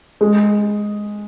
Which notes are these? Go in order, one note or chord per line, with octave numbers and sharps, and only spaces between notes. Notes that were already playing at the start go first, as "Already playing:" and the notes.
G#3